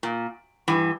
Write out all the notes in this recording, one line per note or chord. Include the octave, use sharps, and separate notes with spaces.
A#2
G2 E3